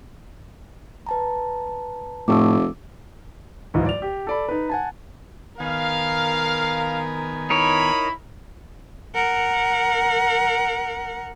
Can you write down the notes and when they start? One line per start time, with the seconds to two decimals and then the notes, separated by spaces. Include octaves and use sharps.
1.06 B4 A5 A#5
2.28 F1 A2 D6 E6
3.74 D1 G#2 E3 F4 D#5
3.86 D5 F7
4.02 G4
4.27 A4 D5 B5
4.49 D#4 B4
4.69 F#5 G#5 A5
5.60 D#3 B3 A#4 F5 G#5
7.50 D#4 E4 A#4 C#5 B5
9.15 A#4 F#5